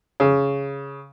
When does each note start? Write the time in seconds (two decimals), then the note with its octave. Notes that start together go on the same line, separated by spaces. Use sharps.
0.20 C#3